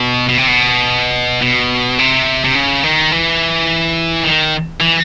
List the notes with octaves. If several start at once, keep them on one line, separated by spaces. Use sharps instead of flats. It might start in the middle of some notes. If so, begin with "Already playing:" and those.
Already playing: B2
B2
C3
B2
B2
C3
C3
C#3
D#3
E3
D#3
E3